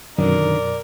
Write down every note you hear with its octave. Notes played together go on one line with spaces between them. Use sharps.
F#2 B2 D3 D#3 A#4 D5